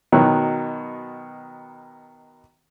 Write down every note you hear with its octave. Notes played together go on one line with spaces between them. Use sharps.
B2 D#3 F#3